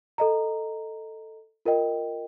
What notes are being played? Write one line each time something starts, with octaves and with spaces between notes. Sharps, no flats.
A4 D#5 A#5
F4 A#4 D#5 G5